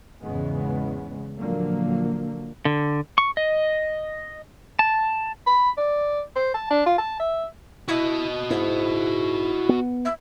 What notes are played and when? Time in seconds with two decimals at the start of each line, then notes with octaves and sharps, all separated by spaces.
0.23 E2 G#2 C#3 G#3 B3
1.39 A#2 D3 F3 F#3 A#3
2.65 D3
3.18 C#6
3.37 D#5
4.79 A5
5.46 B5
5.77 D5
6.36 C5
6.54 A5
6.71 D4
6.86 F4
6.98 A5
7.19 E5
7.88 E4 F#4 D#5
8.50 G#2 E4
9.69 B3
10.05 E5